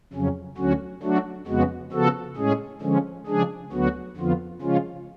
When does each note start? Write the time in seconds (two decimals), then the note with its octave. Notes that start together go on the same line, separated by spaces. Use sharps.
0.13 F2 C#3 F#3 C#4
0.58 D2 D3 F#3 C#4 F#4
1.03 F#3 A3 D4 F#4
1.47 F2 C#3 G#3 B3 F#4
1.92 C#3 F3 B3 F#4 A4
2.37 A2 G#3 C#4 G#4
2.82 D3 F3 G#3 C#4
3.27 C#3 F3 G#3 D4 G#4
3.72 D2 D3 F#3 B3 F#4
4.17 F2 D3 F3 B3 F4
4.61 C#3 F3 G#3 C#4 F4